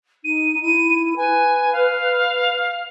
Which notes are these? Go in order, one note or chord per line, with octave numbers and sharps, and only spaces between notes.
D#4 D#7
E4 D#7
B4 G#5
F5